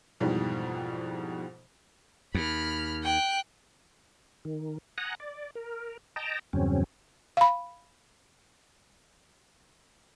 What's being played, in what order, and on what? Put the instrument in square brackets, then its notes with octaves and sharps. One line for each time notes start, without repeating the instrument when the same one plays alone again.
[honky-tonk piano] F2 G#2 B2 E3 G3
[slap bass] D#2 [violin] B5 F6
[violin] G5 F#6
[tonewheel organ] D#3
F#5 G#5 A#5 D#6 F#6
D5
A#4
D#5 G5 A5 A#5
E2 G2 C#3 F#3 C4 C#4
[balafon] F5 B5